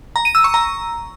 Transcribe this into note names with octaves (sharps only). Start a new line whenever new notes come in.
A#5
D#7
E6
C#6
A#5